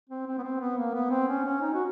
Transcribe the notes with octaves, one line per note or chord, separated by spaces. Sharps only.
C4
C4
B3
C4
B3
A#3
B3
C4
C#4
C#4
D#4
F#4